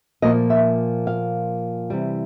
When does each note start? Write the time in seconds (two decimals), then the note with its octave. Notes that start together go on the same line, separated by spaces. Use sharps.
0.22 A#2 F3 A#3 D#5
0.50 E5
1.07 F5
1.90 C3 E3 G3